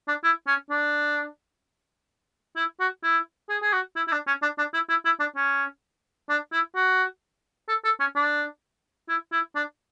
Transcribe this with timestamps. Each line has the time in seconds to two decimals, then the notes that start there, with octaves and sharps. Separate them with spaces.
0.08 D4
0.24 E4
0.47 C#4
0.70 D4
2.56 E4
2.80 F#4
3.03 E4
3.49 G#4
3.62 G#4
3.73 F#4
3.96 E4
4.08 E4
4.12 D4
4.27 C#4
4.42 D4
4.58 D4
4.74 E4
4.89 E4
5.05 E4
5.20 D4
5.36 C#4
6.30 D4
6.52 E4
6.76 F#4
7.69 A4
7.85 A4
8.00 C#4
8.16 D4
9.09 E4
9.32 E4
9.55 D4